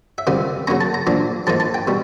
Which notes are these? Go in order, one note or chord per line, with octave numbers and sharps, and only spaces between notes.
E5
C#2 C3 D#3 G3 F5
C#3 F#3 A#3 C#4 A#5
A5
A#5
A#2 F3 A#3 D4
G#2 F3 A#3 D#4 A5
A5
G5
B2 G3